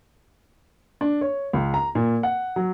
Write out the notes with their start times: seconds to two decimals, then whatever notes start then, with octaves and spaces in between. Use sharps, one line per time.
1.01 D4
1.21 C#5
1.53 C#2
1.74 A#5
1.95 A#2
2.23 F#5
2.56 F#3